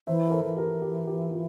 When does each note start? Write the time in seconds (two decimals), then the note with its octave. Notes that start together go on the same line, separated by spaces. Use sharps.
0.07 E3 C5 E5
0.28 A#4
0.32 A4 C5
0.45 E3
0.57 G4 A#4
0.82 G4
1.07 G4
1.31 F4